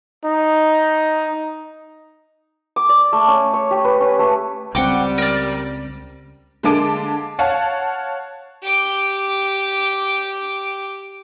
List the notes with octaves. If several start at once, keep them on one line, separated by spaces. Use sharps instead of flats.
D#4
D6
D5
A3
C#4
C#5
G4
B4
C#4
A3
C#2 G3 C4 F#5 G5 D6
A#4 D5
D3 G#3 A#3 A5 D6 D7
C#5 F5 F#5 A5
G4 D6